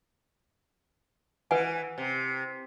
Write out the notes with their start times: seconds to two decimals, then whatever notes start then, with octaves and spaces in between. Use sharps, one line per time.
1.51 E3 B4 F#5 G#5
1.98 C3